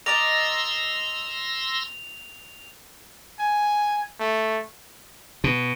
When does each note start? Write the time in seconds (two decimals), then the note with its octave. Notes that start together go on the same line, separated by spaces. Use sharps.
0.06 A#4 D5 D#5 C6 E6 A#6 F7
3.40 G#5
4.20 A3
5.44 B2